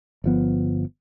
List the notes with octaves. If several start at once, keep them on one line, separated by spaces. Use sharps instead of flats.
G1 F3 B3